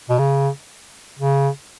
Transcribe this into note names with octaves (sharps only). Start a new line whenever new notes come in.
B2
C#3
C#3